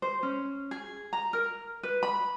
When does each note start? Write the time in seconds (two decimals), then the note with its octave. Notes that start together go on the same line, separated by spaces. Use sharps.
0.02 C5
0.23 C#4
0.71 G#4
1.13 A#5
1.33 A#4
1.83 B4
2.03 B5